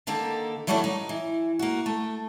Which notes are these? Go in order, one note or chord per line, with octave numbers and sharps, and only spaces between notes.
D3 D#3 A#3 G4 A4
E3 F#3 G3 A3 D4 C#5
D#4
E3
A#3 F#4
A3